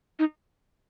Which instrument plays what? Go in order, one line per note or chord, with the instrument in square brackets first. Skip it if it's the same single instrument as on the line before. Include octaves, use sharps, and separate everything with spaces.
[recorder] D#4